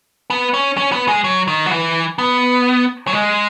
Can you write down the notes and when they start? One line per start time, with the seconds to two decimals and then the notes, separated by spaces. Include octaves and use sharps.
0.30 B3
0.54 C#4
0.78 C#4
0.92 B3
1.08 G#3
1.24 F#3
1.48 D#3
1.66 F#3
1.71 E3
2.18 B3
3.07 F#3
3.13 G#3